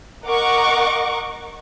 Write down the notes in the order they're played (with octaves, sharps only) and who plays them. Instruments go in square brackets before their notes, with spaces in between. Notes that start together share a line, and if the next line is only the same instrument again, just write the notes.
[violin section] A#4 D#5 F#5 C#6 D6